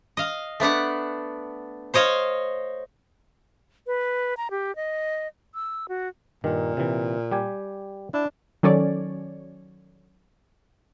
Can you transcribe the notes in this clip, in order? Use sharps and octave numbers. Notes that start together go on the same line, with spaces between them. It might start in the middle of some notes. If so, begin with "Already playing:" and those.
D#5 F5
A3 B3 D4 F#5
C5 C#5 D#5 F5
B4
A#5
G4
D#5
E6
F#4
G2 A#2 D#3
C3 E3
G3 G4 G#5
D4 E4
D#3 F#3 C#4 A4 C#5 D5